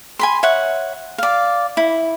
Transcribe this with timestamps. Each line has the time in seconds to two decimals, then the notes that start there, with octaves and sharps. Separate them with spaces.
0.19 G#5 B5 C6
0.43 C#5 E5 F#5
1.18 D5 F5
1.77 E4